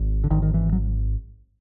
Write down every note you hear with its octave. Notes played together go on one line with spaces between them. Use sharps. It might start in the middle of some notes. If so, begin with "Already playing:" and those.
Already playing: G#1
D3
G#1 D#3
D#3
E3
F#3